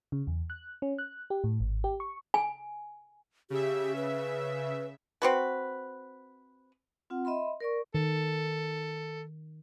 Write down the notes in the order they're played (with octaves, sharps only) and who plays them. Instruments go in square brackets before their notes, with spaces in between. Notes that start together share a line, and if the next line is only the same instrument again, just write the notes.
[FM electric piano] C#3
E2
F#6
C#4
F#6
G4
A2
G#1
G4
C#6
[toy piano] G#5
[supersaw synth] C#3 E5 [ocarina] G4
[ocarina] B4
[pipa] C4 F#4 B4
[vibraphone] C4 F4 F#5
D#5 E5 B5 C6
A#4 D5 C#6
[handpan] D#3 [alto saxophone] A4